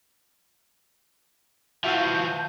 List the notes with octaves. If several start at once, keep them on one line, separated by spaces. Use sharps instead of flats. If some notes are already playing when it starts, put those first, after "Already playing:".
E3 F3 F#4 E5 F5 A5 G6